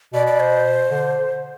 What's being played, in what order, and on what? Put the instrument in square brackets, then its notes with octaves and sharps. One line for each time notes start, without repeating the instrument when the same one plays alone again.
[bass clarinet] B2 [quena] D5
[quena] D5
C5
[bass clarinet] D3